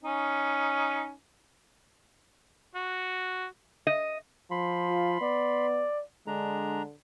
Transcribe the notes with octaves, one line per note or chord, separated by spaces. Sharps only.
C#4 D#4
F#4
D#5
F3 B5 C6
F4
B3 D5
D3 G#3 D4 A#5